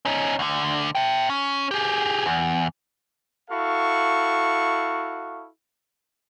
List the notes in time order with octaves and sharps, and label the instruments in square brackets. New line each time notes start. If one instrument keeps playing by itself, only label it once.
[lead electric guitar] C#4 D#4
D2 D3
E5 G5
C#4
G4 G#4
E2
[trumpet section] E4 F#4 A4 F5 C#6